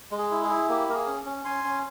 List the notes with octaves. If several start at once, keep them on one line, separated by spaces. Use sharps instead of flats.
G#3
G#4
E4
G#4
E4
A#3 G4
A#3 A#4
G#4
C#4
C#4
C#4 G#5 C6
C#4